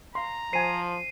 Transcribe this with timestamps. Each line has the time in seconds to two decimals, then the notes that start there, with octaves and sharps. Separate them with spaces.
0.15 F5 A#5 C6
0.53 F3 C5 G#5 C7 D#7